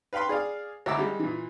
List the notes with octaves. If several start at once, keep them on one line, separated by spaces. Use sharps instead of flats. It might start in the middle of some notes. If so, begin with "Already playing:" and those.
B4 F5 G5 B5 C6
G#4 D5 F5
G#1 D2 E4 A#5 D6 E6
G3 G#3
A#2 E3